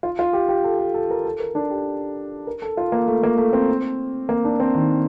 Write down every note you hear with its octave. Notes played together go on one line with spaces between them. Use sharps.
F4
F4
G4
G4
A4
A4
A4
A#4
A4
A#4
D4
G4
A#4
A4
F4
A#3
A3
A#3
A3
C4
A#3
D4
C4
D#3